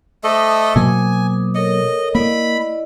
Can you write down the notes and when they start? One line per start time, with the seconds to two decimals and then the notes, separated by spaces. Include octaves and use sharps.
0.24 A3 A4 C5 D#5 D6 D#6
0.76 B2 F#3 A#3 G#5
1.55 A4 A#4 C#5 D#5
2.15 A#3 E4 D5 D#5 B5